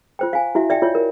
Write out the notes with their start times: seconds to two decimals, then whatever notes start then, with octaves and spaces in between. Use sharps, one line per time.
0.19 F4 C5 G5
0.33 F5 G#5
0.55 E4 F#4 E5
0.70 D5 E5 G5
0.82 F4 C#5
0.95 A#4